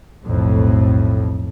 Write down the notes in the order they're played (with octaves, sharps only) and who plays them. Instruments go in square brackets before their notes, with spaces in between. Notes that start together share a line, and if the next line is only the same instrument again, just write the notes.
[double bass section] B1 F2 A2